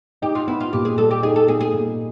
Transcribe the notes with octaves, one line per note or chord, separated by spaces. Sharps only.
D#4 G4
F4
B3 E4
F4
A#2 G4
G#4
G3 A4
G4
D#4 G#4
A4
B3 G#4
G#4
A#2